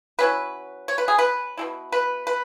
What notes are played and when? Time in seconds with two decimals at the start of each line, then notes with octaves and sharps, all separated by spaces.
0.19 F#3 C#4 E4 B4
0.88 C#5
0.98 B4
1.08 G#4
1.18 B4
1.58 B2 G#3 E4
1.92 B4
2.27 B4